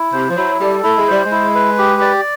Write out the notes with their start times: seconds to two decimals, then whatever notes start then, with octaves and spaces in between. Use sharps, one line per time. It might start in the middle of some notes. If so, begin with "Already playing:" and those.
Already playing: E4
0.13 C3 C5
0.30 F3
0.37 F#3 E4
0.61 G3 A4
0.83 A3 E4
0.98 G#3
1.08 G3 C5
1.25 G#3
1.31 E4
1.55 B4
1.78 G4
2.02 D5